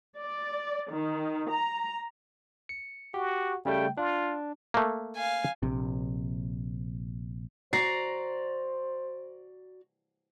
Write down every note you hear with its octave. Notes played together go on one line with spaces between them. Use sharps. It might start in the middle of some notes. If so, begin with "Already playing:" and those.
D5
D#3
A#5
C#7
F#4 G4
C#3 G3 A3 G5
D4 F4
A3 A#3
F5 G#5
A#1 C3
F#4 C5 D5 A#5 C7